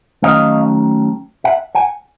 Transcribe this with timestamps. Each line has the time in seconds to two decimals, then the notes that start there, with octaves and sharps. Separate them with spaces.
0.22 D#3 F#3 A3 C#4 D#5 F5
1.44 E5 F#5
1.75 F#5 G#5